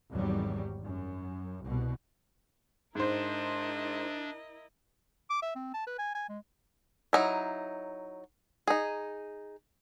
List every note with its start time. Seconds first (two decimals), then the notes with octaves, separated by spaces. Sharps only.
0.12 G#1 E2 F#3 G3
0.81 F#2
1.63 C2 B2
2.95 G#2 D4 E4 A#4 C5 D#5
5.30 D6
5.42 E5
5.56 C4
5.74 A5
5.87 B4
5.99 G#5
6.15 G#5
6.29 G#3
7.13 F#3 D#4 E4
8.67 D#4 G#4